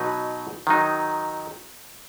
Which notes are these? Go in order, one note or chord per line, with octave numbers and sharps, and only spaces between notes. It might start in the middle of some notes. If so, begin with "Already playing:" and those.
Already playing: B2 F#3 D#4 B4
D#3 F#3 D#4